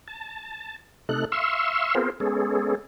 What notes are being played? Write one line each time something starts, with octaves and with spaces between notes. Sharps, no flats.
A5
C3 A3 D#4 A4 F#6
E5 F5 C6 C#6 E6
B3 C4 F4 G#4 A#4 C5
G#3 B3 C#4 G#4 A4